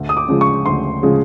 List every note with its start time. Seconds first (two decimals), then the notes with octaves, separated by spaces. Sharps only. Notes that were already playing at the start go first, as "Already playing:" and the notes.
Already playing: D2
0.09 D#6
0.17 D6
0.29 C#3 F3 G#3
0.41 C#6
0.66 D2 C6
1.03 C#3 F3 G#3